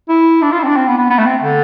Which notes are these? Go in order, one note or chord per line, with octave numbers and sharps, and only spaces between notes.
E4
D4
F4
E4
C4
D4
C4
B3
B3
B3
A3
C4
D3